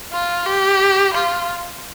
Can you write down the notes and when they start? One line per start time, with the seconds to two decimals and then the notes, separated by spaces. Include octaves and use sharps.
0.12 F4
0.46 G4
1.13 F4